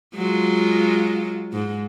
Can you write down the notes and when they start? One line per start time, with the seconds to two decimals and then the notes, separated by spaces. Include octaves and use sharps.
0.15 F#3 G#3 F4
1.53 G#2